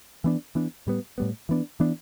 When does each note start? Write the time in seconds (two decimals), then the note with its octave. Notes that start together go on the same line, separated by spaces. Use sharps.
0.24 E3 B3 D4
0.55 E3 B3 D4
0.87 A2 G3 B3
1.18 A2 G3 B3
1.49 E3 B3 D4
1.80 E3 B3 D4